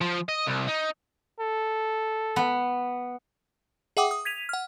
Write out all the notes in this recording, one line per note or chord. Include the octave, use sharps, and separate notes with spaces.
F3
D#5
C2
D#4
A4
B3
G#4 E5 F#5 G5 D6 D#6
D#6
G#6 B6 D#7 F7
F#5 F6